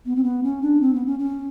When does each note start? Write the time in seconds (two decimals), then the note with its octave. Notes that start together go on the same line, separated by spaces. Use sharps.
0.06 B3
0.16 C4
0.24 B3
0.43 C#4
0.62 D4
0.81 C4
0.94 B3
1.06 C#4
1.19 C#4